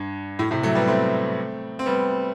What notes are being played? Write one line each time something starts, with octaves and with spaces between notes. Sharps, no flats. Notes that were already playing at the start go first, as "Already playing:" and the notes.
Already playing: G2
A2
A2 C3
F#3 A3
G3 B3
A3 C4
C4
G3 B3